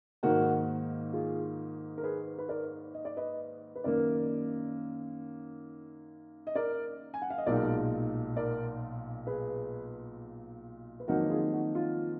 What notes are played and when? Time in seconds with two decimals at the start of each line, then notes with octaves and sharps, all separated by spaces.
0.23 G#2 D#3 A#3 F#4 A#4
1.13 F4 G#4
1.98 A#4
2.03 G#4 B4
2.38 B4
2.49 A#4 D5
2.94 D#5
3.05 D5
3.17 B4 D#5
3.76 B4
3.84 F#2 D#3 A#3 A#4 D5
6.47 D#5
6.55 A#4 D5
7.14 G#5
7.22 F#5
7.30 F5
7.38 D#5
7.46 B1 A#2 G#3 D#4 A#4 D5
8.36 A#4 D5
9.27 G#4 B4
11.00 B4
11.08 F2 D#3 F#3 A#3 D#4 F#4 A#4
11.30 F4 G#4
11.53 F#4
11.75 F4